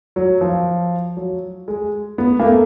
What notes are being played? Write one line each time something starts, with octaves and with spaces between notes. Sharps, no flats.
F#3
F3
F#3
G#3
B3
A#3
A3